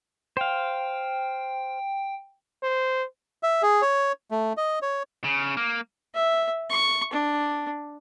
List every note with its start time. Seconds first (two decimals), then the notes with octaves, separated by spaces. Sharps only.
0.37 C5 F5 G5
2.63 C5
3.43 E5
3.62 G#4
3.82 C#5
4.31 A3
4.57 D#5
4.82 C#5
5.24 C#3
5.57 A#3
6.15 E5
6.70 C#6
7.13 D4